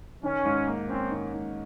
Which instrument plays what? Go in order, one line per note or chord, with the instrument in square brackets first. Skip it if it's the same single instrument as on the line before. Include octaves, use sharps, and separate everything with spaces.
[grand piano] D#3 [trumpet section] C#4
[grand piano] G#2
A#3
[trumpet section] C4 [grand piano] C#4
[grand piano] D#3
G#2